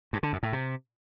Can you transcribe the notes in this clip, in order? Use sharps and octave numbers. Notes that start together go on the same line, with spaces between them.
G2
D3
F#2
A2
C3